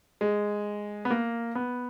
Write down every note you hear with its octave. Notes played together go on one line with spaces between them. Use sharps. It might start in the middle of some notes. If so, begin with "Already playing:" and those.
G#3
B3
A#3
B3